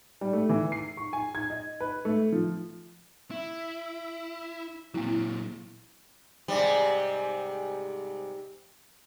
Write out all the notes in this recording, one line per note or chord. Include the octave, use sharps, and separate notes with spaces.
G3
A3
E3
C7
C#6
G#5
G#6
D#5
B4
A3
F3
E4
A#2 F#3 A#3 C4 E4
G#2 C3 G3